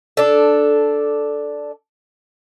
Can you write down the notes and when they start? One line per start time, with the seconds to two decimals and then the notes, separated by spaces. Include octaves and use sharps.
0.17 D4 A4